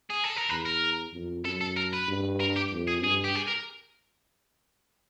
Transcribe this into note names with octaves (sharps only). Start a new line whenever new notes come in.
G#4
A4
A#4
E2 B4
A#4
F2
F#2 A4
A4
A#4
B4
G2
A#4
G4
F2
G#4
G2 G#4
G4
G#4
A#4